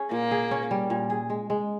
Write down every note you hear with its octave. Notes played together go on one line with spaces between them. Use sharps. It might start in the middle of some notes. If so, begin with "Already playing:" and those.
Already playing: C#4 G#4
A#2 A#3
G#4
C#4
G3
A#2
G#4
G#3
G#3